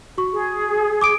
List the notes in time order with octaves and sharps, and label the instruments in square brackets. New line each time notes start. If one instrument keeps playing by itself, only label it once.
[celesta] F#4 C#6
[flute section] G#4
[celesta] D6 D#6 D7